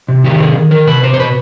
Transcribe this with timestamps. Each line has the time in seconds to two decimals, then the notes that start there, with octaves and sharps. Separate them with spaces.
0.08 C3
0.24 D#3 G4
0.40 C3 G#4
0.55 D#3
0.71 D#3 A#4
0.87 C3 B4
1.03 C3 C5
1.14 C5
1.19 B2 B4